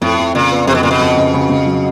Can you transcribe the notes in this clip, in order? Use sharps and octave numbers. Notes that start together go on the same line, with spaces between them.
F2 A2
F2
A#2 C#3
B3
F2 C3
B2
A#2 C#3
B2
F2
C#3
C#3
C#3
F#3